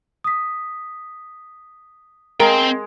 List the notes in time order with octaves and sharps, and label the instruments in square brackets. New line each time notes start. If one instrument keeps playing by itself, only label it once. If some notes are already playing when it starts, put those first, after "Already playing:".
[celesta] D#6 B6
[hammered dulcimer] G#3 [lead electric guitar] C4 G5 [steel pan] A#4